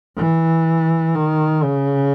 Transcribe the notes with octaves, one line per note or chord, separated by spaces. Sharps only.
E3
D#3
C#3